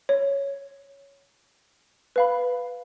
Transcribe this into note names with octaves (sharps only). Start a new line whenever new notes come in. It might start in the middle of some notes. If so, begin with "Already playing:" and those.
C#5
B4 F5 B5